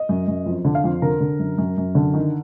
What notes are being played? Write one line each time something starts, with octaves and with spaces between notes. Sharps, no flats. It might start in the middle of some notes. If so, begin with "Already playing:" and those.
Already playing: D#5
F#2
F#2
F2
D3
F5
F2
D3 A#4
D3
F#2
F#2
F#2
D3
D#3